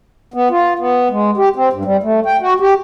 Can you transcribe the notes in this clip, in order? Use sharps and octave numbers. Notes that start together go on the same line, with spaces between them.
B3
F4
B3
G#3
G4
C4
G2
G3
A3
G5
F#4
G4